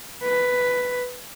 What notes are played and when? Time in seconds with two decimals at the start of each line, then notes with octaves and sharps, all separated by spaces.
0.23 B4